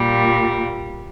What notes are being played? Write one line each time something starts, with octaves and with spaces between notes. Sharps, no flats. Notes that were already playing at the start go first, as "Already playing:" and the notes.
Already playing: A#2 G3